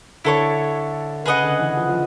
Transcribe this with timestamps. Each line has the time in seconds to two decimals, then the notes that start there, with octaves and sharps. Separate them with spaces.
0.25 D3 E4 A4 C#5
1.26 C#3 G#4 B4 D#5 F#5
1.43 D3
1.59 E3
1.77 F3
1.89 F3